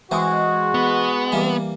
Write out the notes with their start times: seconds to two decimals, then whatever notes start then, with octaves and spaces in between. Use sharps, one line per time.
0.11 E3 G#3 C4 F#4 E5
0.74 B3
1.32 E3 G3 A#3